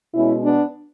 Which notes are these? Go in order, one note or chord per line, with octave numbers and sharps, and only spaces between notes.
B2 G#3 C#4 E4
B3 D4